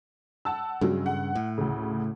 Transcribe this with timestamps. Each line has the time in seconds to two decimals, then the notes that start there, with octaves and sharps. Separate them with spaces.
0.45 F#5 A5 E6
0.81 G2 C#3 F#3 G#3
1.06 F#5
1.35 A2
1.58 D2 C#3